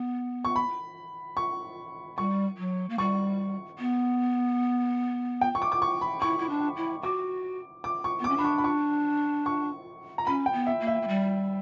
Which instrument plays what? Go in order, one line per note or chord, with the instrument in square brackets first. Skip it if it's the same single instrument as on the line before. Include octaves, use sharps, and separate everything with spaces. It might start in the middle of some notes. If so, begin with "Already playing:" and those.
Already playing: [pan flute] B3
[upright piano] C#6
B5
C#6
[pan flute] G3 [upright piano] C#6
[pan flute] F#3
A#3
[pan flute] G3 [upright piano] C#6
[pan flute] B3
[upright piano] G5
C#6
D6
D6
C#6
B5
[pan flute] E4 [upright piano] C#6
[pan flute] E4
D4
E4
[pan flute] F#4 [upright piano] D6
[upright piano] D6
C#6
[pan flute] B3
[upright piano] D6
[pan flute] C#4
[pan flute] D4 [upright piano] B5
[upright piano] C#6
B5
C#6
C#6
A#5
[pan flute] C#4 [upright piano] B5
[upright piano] G5
[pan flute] B3
[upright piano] E5
[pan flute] A#3
[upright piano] E5
[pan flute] A#3
G3